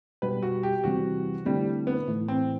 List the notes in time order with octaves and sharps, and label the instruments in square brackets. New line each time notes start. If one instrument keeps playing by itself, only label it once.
[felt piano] B2 G3 B3 [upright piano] B4
[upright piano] F#4
G4
[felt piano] E2 C3 E3 G3 C4 [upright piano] F#4
[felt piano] D3 A3 C4 E4 [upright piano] G3
[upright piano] B3
[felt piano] A2 E3 A3
[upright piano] C4